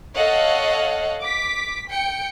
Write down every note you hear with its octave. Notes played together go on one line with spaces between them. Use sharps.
A4 C#5 D#5 F5 F#5
D6 B6
G5 C#7